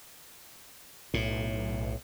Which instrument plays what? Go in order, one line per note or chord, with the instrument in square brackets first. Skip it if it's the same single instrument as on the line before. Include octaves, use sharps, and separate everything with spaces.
[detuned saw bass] B1 [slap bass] A2